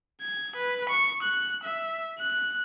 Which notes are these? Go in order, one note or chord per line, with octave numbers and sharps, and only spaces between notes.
G#6
B4
C#6
F#6
E5
F#6